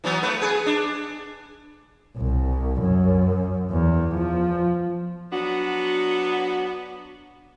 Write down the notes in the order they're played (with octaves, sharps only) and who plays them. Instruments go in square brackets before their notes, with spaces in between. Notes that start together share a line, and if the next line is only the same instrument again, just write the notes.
[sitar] E3 F#3 B3
A3 B4
G#4 B4
D4
[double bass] C2
F#2
E2
F3
[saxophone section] F#3 B3 D4 F#4